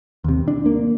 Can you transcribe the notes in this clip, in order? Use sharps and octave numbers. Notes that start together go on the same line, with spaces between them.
D#2 C3
D4
A#3